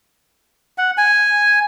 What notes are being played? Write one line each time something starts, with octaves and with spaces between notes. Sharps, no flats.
F#5
G#5